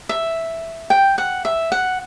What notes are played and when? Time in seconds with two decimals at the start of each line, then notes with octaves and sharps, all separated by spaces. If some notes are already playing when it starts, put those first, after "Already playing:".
0.09 E5
0.90 G5
1.18 F#5
1.45 E5
1.72 F#5